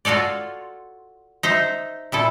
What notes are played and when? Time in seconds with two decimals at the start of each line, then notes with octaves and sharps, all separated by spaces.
0.05 F4 F#4 A4 C#5 D5
1.43 D#4 C5 E5
2.12 A#2 E4 A4